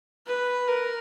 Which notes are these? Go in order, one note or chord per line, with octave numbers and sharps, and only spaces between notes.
B4
A#4